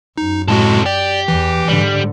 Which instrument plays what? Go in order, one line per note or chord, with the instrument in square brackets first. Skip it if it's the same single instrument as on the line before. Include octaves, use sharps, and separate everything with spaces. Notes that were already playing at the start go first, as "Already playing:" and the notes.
[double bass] F#2 [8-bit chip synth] D#4
[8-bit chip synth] A2 G#3 F#4 [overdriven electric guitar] C3 A4
[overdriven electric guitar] G4 [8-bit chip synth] D5
[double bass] E2 [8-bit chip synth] E3
[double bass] G#2 D3 [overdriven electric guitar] G3